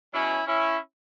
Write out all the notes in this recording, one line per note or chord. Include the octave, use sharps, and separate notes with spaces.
B2 F#3 C#4 E4
C#4 E4